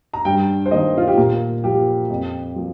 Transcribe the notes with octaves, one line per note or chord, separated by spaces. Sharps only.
A#5
G2 G5
C5
D#3 A#3 D#5
F4
G4
A#2 A#4
F3 A#3 G4
F2
F3 A#3